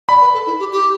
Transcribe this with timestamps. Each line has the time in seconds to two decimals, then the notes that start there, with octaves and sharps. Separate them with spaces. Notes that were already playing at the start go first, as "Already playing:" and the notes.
0.09 D5 B5
0.21 B4
0.34 A4
0.47 E4
0.59 G4
0.72 G4